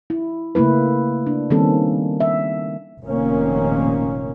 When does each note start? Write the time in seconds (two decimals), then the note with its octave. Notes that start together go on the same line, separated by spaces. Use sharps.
0.10 E4
0.55 C#3 A3 A#3 E4 B4
1.27 D4
1.51 D#3 G3 A#3 C4 C#4 A4
2.20 E5
3.03 F1 A#2 D#3 A#3 C#4